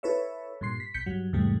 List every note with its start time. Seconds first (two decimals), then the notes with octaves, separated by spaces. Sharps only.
0.03 E4 A4 B4 C#5 E5
0.61 G2 A#2 C6 C7
0.80 B6
0.94 B1 G6 B6 C#7
1.06 G2 F#3
1.33 E2 G#2 C3 G3 A3